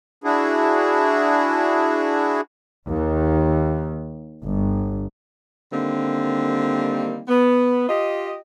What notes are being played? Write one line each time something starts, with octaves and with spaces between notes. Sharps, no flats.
D4 E4 F#4 G#4
D#2
G1
D3 D#3 G3 A#3 C4
B3
F4 G4 D#5